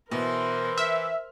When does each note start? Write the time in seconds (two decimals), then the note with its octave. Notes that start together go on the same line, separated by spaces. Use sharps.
0.11 B2 E3 A#4 C5
0.78 E5 F6